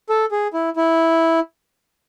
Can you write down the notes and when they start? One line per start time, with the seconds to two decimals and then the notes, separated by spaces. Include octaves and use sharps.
0.10 A4
0.32 G#4
0.54 E4
0.77 E4